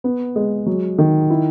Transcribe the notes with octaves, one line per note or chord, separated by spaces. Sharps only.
B3
G#3
F#3
D#3
E4